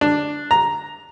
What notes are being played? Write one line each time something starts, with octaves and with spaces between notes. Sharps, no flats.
D4
A#5